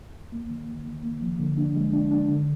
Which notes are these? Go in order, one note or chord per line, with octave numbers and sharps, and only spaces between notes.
D#2
A#3
D#3
D#3
D#3
A#3
F3
D3
D4
G#3
D4
D4
D3